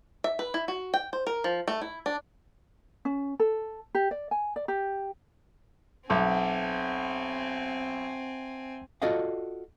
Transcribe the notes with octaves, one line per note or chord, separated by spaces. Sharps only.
E5
B4
E4
F#4
G5
C5
A#4
F3
A3
E4
D4
C#4
A4
G4
D5
G#5
D5
G4
B1 C4 E5 F#5 G#5 A5 D6
F4 F#4 A4 D5 D#5 F5